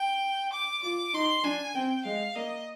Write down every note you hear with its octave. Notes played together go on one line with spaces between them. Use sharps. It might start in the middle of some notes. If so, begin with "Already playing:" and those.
Already playing: G5
D6
F4 D6
D#4 C6
D4 G#5
C4 G5
G#3 F5
A#3 D#5